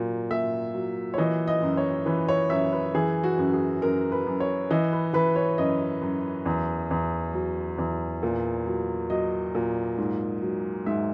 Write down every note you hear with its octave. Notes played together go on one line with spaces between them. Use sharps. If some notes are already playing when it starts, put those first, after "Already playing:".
Already playing: A#2 F#3
A#2 E5
F#3
C#5
E3 D#5
D#5
F#2
C#5
E3 B4
C#5
F#2 E5
B4
E3 G#4
F#4
F#2
G#4
F#2 A#4
B4
F#2
C#5
E3 D#5
B4
E3 B4
C#5
F#2 D#5
F#2
E2
E2
F#3
E2
A#2
F#3
F#3 D#5
A#2
G#2
F#3
G#2 E5